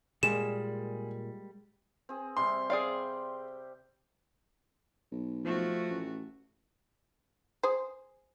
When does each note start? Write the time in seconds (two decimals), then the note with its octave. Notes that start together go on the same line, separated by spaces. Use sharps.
0.23 A#2 G3 G#3 A#3 G#4 E7
2.09 C4 G#4
2.37 C3 G3 C6
2.70 G#4 C5 D5 F5 G5
5.12 B1
5.44 F3 A3 F#4
5.90 A1
7.63 G#4 C5